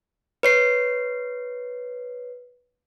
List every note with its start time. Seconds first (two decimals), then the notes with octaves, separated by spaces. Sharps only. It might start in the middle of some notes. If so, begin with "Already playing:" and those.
0.43 B4 C#5 C7